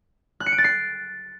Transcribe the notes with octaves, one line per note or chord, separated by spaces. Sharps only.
F#6
C#7
D7
A6
C7